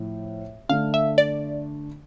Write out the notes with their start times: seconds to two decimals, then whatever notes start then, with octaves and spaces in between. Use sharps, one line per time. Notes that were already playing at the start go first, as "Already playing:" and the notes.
Already playing: A2 F3
0.69 D3 A3 D4 F5
0.94 E5
1.18 D5